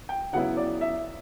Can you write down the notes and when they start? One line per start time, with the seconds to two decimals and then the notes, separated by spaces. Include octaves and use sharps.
0.09 G5
0.33 C#3 F#3 B3 E4 F#5
0.57 D5
0.81 E5